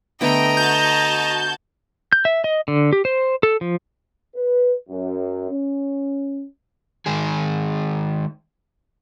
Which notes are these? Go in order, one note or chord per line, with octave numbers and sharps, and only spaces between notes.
D3 A3 B3 D#5 G5 A#5
F#4 A5 G6
G6
E5
D#5
D3
G4
C5
A4
F3
B4
F#2
C#4
D#3 G#3 G#4